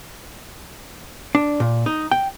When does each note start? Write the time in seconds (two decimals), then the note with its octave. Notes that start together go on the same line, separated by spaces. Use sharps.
1.35 D4
1.60 A#2
1.86 D#4
2.12 G5